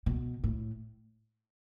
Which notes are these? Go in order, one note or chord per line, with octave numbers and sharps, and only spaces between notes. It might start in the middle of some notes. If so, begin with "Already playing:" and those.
B2
A2